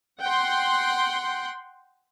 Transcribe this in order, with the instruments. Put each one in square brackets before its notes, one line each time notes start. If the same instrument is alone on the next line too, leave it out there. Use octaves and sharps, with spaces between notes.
[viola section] F#5 G5 C6